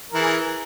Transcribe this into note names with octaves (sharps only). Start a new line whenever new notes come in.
E3 G#4 A#4